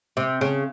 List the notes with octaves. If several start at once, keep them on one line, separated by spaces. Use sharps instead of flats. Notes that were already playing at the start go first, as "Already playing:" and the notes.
C3
C#3